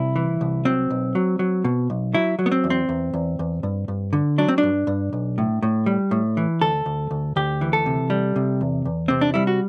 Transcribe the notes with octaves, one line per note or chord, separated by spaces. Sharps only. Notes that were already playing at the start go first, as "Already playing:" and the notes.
Already playing: C2 C3 E4
E3
C2
F#3 C4
B1
F#3
F#3
B2
B1
F#3 E4
F#3
B3
C4
E2
C4
E2
E2
E2
G2
G2
D3
F#3 D4
C4
D4
G2
G2
B1
A2
A2
G3
A2
E3
D2 A4
D2
D2
D2 G4
E3
A4
C3
G3
C3
E2
E2
C3 C4
D4
G3 E4
F#4